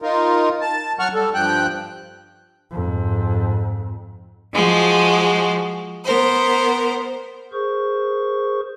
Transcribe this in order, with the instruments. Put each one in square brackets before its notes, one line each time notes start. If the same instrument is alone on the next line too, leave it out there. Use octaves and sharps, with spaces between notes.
[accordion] D#4 F4 A#4
A5
F#3 F#5 C#6 F6
G3 A4
G2 F3 G5 F#6
[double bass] F2 G#2
[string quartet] F3 G#3 F#4
B3 A#4 C5
[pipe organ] G#4 A#4 C5 C#6